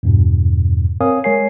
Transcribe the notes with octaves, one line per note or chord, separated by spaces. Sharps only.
E2 G2 B2
C4 A#4 C#5 F5 G#5 D#6
G#3 A#4 C#5 G#5 C7